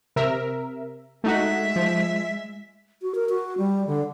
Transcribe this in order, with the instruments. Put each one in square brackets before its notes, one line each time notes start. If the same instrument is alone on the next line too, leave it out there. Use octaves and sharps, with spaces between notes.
[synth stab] C3 A#4 E5
[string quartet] G#3 E5 [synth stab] A3 D#4 F#4
[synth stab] F3
[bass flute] F#4
A#4
F#4
G3
D3